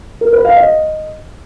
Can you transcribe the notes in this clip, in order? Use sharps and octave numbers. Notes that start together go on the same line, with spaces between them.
A#4
B4
F5
D#5